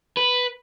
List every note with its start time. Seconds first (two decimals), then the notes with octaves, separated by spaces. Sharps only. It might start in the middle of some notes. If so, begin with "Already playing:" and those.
0.17 B4